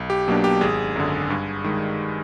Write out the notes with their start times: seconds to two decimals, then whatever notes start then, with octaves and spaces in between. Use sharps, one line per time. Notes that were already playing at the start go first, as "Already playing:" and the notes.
Already playing: B1
0.10 G4
0.28 B2 F#3 A#3 D4
0.44 G4
0.61 G#1 G#4
0.96 F#2 D3
1.30 G2
1.64 D#3 G#3